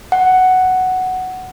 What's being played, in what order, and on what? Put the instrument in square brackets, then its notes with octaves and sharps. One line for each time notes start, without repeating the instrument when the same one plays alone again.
[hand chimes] F#5